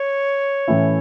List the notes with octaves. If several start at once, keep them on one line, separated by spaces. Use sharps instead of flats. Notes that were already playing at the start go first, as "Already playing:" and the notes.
Already playing: C#5
A2 E3 A3 C#4 E4